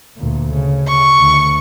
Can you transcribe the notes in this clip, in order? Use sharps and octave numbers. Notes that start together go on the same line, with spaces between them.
D2 A#2
C#3
C#6
D2 D3